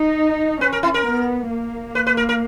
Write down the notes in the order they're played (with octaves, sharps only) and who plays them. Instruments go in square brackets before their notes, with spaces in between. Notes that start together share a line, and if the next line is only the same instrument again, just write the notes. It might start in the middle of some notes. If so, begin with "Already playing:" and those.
Already playing: [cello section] D#4
[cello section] C#4 [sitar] B4
[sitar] A#4
E4
A#4
[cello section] B3
A#3
[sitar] B4
B4
A#4
A#4